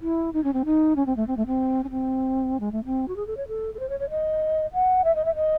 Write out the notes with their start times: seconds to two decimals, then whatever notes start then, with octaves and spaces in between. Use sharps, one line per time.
0.02 E4
0.33 D#4
0.44 C#4
0.53 C4
0.65 D#4
0.96 C#4
1.06 C4
1.17 A3
1.27 C4
1.37 A3
1.47 C4
1.84 C#4
1.91 C4
2.60 G#3
2.72 A3
2.85 C4
3.08 F#4
3.16 G#4
3.27 A4
3.37 C#5
3.48 A4
3.75 A4
3.79 C5
3.89 C#5
4.00 C#5
4.10 D#5
4.73 F#5
5.04 E5
5.15 D#5
5.25 E5
5.35 D#5